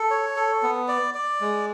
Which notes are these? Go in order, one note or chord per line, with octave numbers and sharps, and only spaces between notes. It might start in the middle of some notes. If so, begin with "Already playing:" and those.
Already playing: A4
C#5
A4
B3
D5
D5
G#3